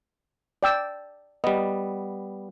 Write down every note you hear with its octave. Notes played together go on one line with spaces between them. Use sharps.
D5 G5 E6
G3 B3 D#5